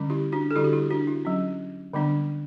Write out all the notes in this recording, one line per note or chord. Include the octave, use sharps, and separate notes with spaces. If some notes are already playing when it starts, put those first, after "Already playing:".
Already playing: D3 G3 C#4
E4 G4
D4 F#4
A4
D3 G3 D4 E4 G4
F#4
E4 G4
D4 F#4
E4
F#3 C#4
D3 G3 B3 D4